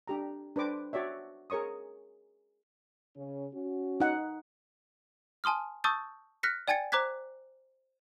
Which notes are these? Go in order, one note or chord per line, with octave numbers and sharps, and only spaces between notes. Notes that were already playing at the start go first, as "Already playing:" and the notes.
D4 G4 A#5
D4 B4 C5 D6
F#4 C#5 D5 E5
G#4 A#4 C#5 C#6 D#6
C#3 C#4
C#4 F#4
D#4 F#5
G#5 A5 C6 D#6 F6
A5 C#6 D#6 E6 G6 A6
F6 F#6 A#6 B6 C#7
D5 G5 G#5 G#6 A6 C#7
C5 A#5 D6 F#6 G#6 B6